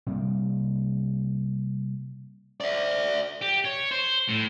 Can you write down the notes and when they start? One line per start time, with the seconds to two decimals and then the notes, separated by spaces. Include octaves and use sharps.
0.07 C3 G3 A#3
2.61 D5 E5
3.41 G4
3.65 C#5
3.91 C5
4.29 A2